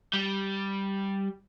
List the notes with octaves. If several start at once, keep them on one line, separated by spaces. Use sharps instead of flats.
G3